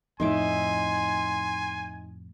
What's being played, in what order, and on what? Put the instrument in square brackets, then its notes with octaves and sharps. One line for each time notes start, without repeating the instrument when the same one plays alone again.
[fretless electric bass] F2 A2 [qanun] D#4 E5 D6 [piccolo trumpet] G#5 [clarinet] C6